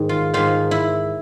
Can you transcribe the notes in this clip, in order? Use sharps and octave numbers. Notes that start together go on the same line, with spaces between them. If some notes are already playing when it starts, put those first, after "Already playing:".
Already playing: G#2 D#3
F4
G#2 D#3 F4
E4